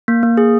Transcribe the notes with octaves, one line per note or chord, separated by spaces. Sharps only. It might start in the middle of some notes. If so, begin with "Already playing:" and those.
A#3
A#3
G#4